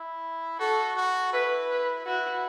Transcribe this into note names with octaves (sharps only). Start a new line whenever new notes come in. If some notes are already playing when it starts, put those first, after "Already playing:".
Already playing: E4
F#4 A4
F#4
E4 B4
B4
E4 F#4